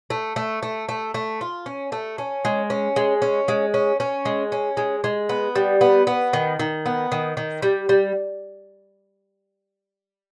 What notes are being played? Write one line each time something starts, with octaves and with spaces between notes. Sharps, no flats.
A3
A3
A3
A3
A3
F4
C#4
A3
C#4
G#3
C#4
G#3
C#4
G#3
C#4
C#4
G#3
C#4
G#3
G#3
B3
G3
B3
B3
D#3
D#3
B3
D#3
D#3
G3
G3